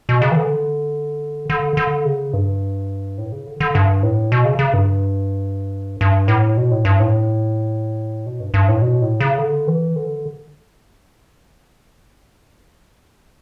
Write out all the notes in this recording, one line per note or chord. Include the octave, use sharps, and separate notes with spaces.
B2
C#3
E3
D3
D3
D3
C#3
G2
A2
C#3
D3
D3
G2
A2
B2
C#3
C#3
G2
G2
A2
B2
A2
G2
A2
B2
G2
G2
A2
B2
A2
C#3
D3
E3
D3